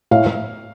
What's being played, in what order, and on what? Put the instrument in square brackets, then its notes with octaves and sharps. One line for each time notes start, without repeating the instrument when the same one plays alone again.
[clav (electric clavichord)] A2 [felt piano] F5